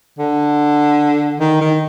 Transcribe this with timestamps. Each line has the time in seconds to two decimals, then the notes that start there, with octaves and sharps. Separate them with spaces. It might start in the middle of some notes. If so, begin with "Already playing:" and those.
0.19 D3
1.40 D#3
1.61 D#3